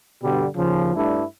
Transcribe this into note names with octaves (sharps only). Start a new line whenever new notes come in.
G2 B2 D3 G3
D#2 C#3 F3
G2 G3 A3 D4 E4